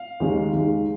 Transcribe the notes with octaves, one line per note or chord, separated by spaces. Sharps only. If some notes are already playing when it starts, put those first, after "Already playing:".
Already playing: F5
D#2 D#3 G#3
D#2 D#3 G#3